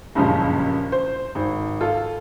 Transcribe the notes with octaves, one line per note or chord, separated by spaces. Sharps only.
F#1 C#2 G2 A#2 C#3 F3
C5
G#1
F4 A4